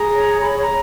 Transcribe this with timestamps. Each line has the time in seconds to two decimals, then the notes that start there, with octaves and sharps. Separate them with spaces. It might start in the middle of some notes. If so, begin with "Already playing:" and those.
Already playing: G#4 A#5
0.14 C#5
0.42 G#4 B5
0.62 A#5